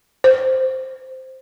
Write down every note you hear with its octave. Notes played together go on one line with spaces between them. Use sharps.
C5